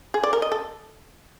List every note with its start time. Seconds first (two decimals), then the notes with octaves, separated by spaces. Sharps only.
0.14 G#4
0.23 D5
0.33 A#4
0.42 D#5
0.52 A4